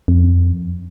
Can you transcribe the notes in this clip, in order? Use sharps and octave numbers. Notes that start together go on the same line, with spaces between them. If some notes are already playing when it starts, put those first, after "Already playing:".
F2